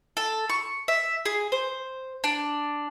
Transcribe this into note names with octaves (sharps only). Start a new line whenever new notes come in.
A4
C#6
E5
G#4
C5
D4